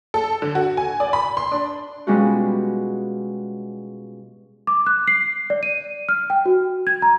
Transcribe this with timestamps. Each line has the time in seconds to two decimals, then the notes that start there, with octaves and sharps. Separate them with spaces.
0.14 A4
0.42 D3
0.55 F#4
0.77 G#5
1.00 D5
1.13 B5
1.37 C6
1.52 D4
2.07 B2 G3 G#3 C#4 F4 F#4
4.67 D6
4.87 F#6
5.08 C7
5.50 D5
5.63 D#7
6.09 F6
6.30 G5
6.46 F#4
6.87 G#6
7.02 A#5